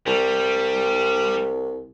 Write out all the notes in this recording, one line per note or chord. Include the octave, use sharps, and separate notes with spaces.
C2 G3